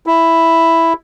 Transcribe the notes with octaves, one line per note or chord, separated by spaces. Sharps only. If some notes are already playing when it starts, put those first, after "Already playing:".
E4